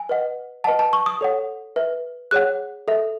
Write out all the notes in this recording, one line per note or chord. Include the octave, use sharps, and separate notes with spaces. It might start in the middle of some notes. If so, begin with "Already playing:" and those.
Already playing: G#5
B4 D#5 F#5
B4 D#5 F#5 A5
A5
C#6
D#6
A4 C#5 F#5
B4 E5
G#4 C#5 F#5 F#6
A4 E5